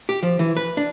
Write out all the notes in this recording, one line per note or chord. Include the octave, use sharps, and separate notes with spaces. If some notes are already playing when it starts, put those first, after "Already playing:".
G4
F3
E3
B4
D4